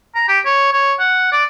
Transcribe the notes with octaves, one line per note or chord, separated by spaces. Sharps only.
A#5
G4
C#5
C#5
F#5
D5